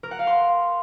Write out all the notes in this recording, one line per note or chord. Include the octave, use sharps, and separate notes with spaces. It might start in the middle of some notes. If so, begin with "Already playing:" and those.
A#4
F#5
F5
C6